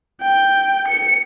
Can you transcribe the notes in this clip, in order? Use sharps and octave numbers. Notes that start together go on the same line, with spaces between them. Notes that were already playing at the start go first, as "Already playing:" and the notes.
G5
C#7